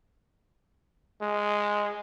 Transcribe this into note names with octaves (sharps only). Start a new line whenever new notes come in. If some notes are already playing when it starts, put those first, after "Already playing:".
G#3